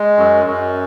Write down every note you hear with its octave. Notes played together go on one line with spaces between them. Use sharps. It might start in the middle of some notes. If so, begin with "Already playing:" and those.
Already playing: G#3
F#2
F#2